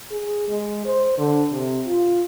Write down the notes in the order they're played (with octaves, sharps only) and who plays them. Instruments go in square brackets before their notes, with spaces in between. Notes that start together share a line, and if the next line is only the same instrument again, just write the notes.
[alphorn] G#4
G#3
C5
D3
C3
F4